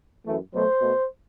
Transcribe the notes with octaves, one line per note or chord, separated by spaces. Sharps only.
F#2 E3 A3
B2 F#3 A3 C5
B2 A3